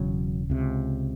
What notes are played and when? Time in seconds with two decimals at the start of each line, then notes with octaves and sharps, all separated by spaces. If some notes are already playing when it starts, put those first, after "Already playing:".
Already playing: E1 E2 C#3 F#3
0.50 C#2 C3